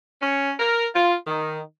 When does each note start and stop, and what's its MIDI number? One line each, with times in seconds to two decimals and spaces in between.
0.21 0.52 61
0.59 0.86 70
0.95 1.14 65
1.26 1.60 51